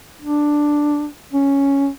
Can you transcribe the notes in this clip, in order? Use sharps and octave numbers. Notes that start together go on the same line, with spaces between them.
D4
C#4